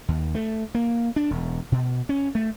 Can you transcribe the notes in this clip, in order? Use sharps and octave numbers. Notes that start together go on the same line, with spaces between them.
D#2
A3
A#3
D4
E1
B2
C#4
A3